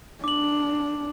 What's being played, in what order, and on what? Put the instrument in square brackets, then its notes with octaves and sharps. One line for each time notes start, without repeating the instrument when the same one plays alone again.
[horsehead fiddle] D4 [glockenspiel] D6 F#7